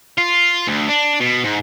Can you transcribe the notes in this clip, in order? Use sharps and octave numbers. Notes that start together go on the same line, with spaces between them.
F4
D2
D4
B2
G#2